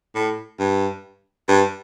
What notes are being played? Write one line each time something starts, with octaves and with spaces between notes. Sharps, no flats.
A2
G2
G2